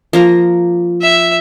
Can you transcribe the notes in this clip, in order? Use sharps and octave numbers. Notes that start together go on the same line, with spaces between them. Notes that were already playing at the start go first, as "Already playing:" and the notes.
F3 A#3 A#5
E5